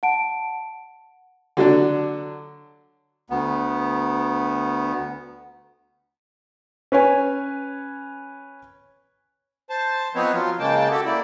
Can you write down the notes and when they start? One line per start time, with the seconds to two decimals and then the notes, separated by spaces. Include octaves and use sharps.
0.03 F#5 A5 D7
1.57 D3 F#3 D4
3.30 D2 B3
6.92 C#4 B4 C#5 G#5
9.70 C5 A5
10.15 F3 B3 C4 D#4 B4 C#5
10.33 F3 F#3 F4
10.60 C#3 G#3 A#3 G5 A5
10.91 F#4 G4 A4
11.06 A#3 E4 D5